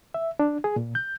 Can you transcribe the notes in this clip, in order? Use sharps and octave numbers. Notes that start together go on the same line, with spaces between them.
E5
D4
G#4
A#2
G6